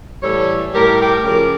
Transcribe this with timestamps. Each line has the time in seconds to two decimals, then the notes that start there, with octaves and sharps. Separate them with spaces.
0.23 A2 E3 G3 A4 C#5
0.73 A2 G3 G4 A#4
0.99 G4 A#4
1.24 C#3 F3 G4 A#4